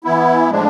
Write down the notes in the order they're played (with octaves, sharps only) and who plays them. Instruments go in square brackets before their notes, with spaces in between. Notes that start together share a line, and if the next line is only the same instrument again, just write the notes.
[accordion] E3 B3 E4
A2 F3 G#3 D4